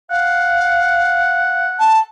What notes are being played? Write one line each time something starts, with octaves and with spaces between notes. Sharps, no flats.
F5 F#5
A5